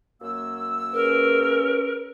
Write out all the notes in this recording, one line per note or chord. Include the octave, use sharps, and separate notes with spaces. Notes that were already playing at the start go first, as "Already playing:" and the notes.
F#2 A#3 E6
C#4 G#4 A#4 B4